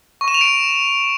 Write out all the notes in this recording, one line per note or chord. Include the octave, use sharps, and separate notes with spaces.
C#6
E7
F7
D7